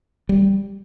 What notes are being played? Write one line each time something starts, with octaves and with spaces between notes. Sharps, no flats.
G3